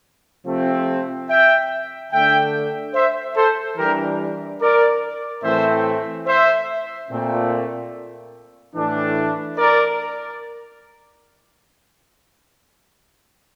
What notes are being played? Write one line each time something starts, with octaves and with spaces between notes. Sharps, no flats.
C3 F3 A3 C4
E5 G5
D3 A3 D4 E5 G5
C5 E5
A4 C5
E3 G3 D4 G4 A#4
A#4 D5
A2 E3 A3 C4 C5 E5
C5 E5
A#2 A3 C4
A2 E3 A3 D4
A#4 D5